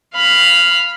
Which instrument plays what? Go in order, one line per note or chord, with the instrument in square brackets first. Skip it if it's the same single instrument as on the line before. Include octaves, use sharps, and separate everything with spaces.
[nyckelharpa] F5 B5